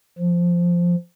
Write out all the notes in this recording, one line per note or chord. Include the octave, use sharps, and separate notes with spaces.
F3